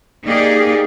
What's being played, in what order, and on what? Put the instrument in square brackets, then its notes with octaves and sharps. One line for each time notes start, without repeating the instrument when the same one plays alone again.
[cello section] A#3 D#4 G4 G#4 D5